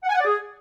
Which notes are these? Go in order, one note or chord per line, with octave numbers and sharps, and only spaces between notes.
F#5
G#5
F#5
D5
G#4